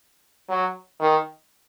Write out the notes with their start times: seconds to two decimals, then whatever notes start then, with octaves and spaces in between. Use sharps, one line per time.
0.49 F#3
1.00 D#3